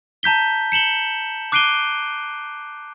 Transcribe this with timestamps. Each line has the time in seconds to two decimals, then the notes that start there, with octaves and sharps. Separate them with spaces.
0.23 A5 A#5 G6 B6 G7
0.72 C#7 E7 F#7 G7
1.52 D6 F#6 C7 D7 D#7 G7